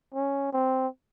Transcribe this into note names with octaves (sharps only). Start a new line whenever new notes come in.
C#4
C4